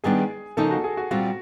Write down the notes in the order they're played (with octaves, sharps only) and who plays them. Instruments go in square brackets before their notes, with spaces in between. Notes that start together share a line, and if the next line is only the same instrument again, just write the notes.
[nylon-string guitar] D#3 G3 B3 D4 [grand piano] G#4
[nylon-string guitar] C#3 F3 A#3 D#4 [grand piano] A4
[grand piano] F#4
G#4
F#4
[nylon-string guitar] A#2 G3 C4 F4 [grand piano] F#4